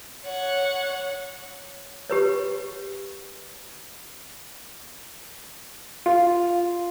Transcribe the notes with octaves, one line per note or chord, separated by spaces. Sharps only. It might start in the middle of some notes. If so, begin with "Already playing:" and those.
C#5 F#5
G4 B4 C#5
F4